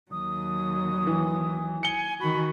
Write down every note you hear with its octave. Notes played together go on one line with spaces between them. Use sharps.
D#2 F#3 D#6
E3
G#5 C#7 G7
D#3 F#4 B5